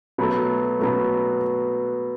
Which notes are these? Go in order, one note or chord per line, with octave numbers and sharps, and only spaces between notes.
B2 F#3 A3
B2 F#3 A3